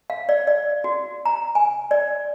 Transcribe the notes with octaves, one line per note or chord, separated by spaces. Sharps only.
F5
D5
D5
F#4
A#5
G#5
D5